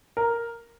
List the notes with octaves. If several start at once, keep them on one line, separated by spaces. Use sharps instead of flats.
A#4